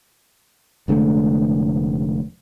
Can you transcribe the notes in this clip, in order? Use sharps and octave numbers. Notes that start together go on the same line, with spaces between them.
F1 D3 G#3 A3